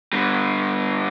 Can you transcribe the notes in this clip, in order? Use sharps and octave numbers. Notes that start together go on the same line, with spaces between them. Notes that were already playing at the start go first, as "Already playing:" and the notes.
D3 G3